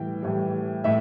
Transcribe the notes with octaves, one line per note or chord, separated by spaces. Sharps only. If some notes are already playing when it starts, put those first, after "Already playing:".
Already playing: A2 E3 G3 G5
A2 E3 G3
A2 E5